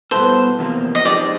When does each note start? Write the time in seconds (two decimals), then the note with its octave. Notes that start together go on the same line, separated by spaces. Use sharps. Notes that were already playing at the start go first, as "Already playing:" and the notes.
0.11 B2 G3 B3 E4 A4 C5
0.59 E2 C3 F3 A#3
0.95 D#5
1.05 F3 G#3 C4 D#4 G4 D5